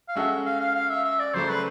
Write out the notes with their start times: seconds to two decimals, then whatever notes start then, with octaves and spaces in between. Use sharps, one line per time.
0.08 F5
0.16 G#3 C#4 F#4 A4 E5
0.46 F5
0.61 F5
0.75 F5
0.90 E5
1.04 E5
1.19 D5
1.34 C#3 F#3 A3 C5
1.49 B4